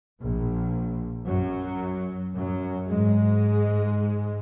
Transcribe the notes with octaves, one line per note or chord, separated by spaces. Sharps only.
A#1 A#2
F#2 F#3
F#2 F#3
G#2 G#3